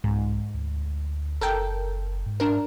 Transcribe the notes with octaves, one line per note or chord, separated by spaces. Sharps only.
C2 G#2
D2
F#1 A4 A#4 G5
G#2
D4 A#4